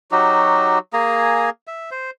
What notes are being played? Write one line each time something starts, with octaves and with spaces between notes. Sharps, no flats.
F#3 D#4 F#4 G4
A#3 G#4 G#5 A#5
E5
C5